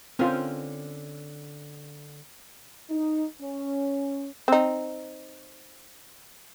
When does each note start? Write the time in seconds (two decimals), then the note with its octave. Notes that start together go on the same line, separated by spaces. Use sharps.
0.19 D3 C4 C#4 F4 A#4 C5
2.90 D#4
3.41 C#4
4.48 C4 D#4